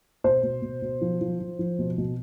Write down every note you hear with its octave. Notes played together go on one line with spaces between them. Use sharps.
B2 C5
B2
B2
B2
F3
F3
F3
F3
B2
B2